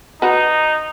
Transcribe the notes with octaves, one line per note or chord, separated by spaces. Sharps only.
D#4 F#4 B4